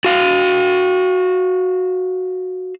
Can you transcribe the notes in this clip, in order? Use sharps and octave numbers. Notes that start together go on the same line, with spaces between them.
F#4 F5